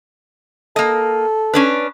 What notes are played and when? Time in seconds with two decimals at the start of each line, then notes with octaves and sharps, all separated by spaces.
0.76 A#3 A4 D#5
1.54 C#4 D4 B4